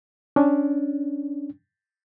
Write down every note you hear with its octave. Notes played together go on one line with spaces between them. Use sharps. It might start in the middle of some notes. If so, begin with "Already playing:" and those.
C#4 D4